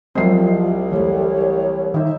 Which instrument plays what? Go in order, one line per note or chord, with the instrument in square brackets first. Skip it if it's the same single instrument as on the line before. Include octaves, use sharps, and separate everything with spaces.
[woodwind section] C2 [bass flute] F3 [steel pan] F#3 G#3 C4 [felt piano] D#5 E5 C7
[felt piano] E3 G3 A3 [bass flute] C#5
[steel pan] D#3 D#4 [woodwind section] E5